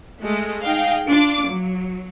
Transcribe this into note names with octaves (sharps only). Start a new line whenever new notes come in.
G#3 A3
D#4 G#4 F5 G5
D4 F4 D6
F#3